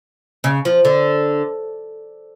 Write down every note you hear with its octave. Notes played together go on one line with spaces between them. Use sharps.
C#3
F3
D3